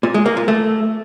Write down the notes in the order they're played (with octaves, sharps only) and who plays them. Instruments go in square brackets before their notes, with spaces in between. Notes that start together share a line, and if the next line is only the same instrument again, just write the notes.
[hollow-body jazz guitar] A#2
G#3
A#3
A#2
A3